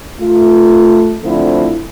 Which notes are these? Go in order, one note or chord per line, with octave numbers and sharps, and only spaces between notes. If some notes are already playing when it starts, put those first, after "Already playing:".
A3 F4
D3 F3 A3 C4 E4